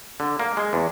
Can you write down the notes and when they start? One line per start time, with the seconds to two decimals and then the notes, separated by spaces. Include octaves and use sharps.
0.20 D3
0.40 A#3
0.57 G#3
0.73 E2